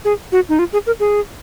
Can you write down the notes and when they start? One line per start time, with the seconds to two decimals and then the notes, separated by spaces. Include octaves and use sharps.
0.05 G#4
0.32 F#4
0.49 D#4
0.59 F4
0.73 G#4
0.87 A#4
1.00 G#4